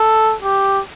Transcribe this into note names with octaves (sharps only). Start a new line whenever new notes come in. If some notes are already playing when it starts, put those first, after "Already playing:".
Already playing: A4
G4